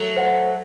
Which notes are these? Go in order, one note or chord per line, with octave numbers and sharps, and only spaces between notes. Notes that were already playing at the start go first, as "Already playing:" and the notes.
Already playing: F#3 A3
C5 F#5